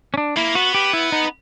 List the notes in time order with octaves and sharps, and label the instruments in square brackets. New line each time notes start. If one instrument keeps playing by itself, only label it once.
[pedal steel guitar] C#4
D4
[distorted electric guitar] A#3 [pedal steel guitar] E4
[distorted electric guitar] B3 [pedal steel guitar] F#4
[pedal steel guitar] G4
E4
D#4